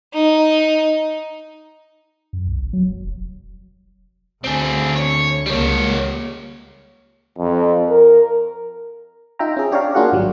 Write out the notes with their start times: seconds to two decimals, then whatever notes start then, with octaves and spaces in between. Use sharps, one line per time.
0.14 D#4
2.33 F#2
2.47 B1
2.60 G1
2.73 F#3
2.89 F1
3.07 E1
4.44 D2 C4 G#4
4.96 C#5
5.46 C#2 G3 A#3 C#5
7.38 F2
7.90 A#4
9.39 D#4 F4 E5 G5 A#5
9.57 C#4 G#4
9.71 D4 G4 C#5 D5 F5 A#5
9.95 A#3 D4 F4 F#4 G#4 F#5
10.12 G#1 F#3 G3